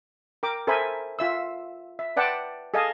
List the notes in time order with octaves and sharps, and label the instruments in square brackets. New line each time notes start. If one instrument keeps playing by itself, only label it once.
[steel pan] A#4 G5 D6
A4 A#4 C5 E5 G#5 B5
F4 E5 E6
E5
B4 D5 F#5 G5 A5
G#4 A4 D#5 F5 G#5 A5